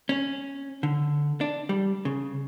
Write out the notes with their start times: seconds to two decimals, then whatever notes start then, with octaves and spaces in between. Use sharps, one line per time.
0.09 C#4
0.83 D3
1.41 D4
1.69 G3
2.05 C#3